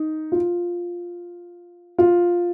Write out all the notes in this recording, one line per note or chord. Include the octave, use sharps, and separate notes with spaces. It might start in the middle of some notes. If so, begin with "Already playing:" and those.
Already playing: D#4
F4
F4